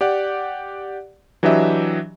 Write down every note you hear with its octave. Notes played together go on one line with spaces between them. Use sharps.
G4 D5 F#5
E3 F#3 D4 G4 D#5 E5